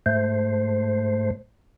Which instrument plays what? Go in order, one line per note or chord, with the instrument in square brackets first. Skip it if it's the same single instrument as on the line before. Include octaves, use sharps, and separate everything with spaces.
[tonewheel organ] G#2 A3 C5